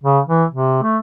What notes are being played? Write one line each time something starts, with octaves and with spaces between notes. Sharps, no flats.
C#3
E3
C3
A3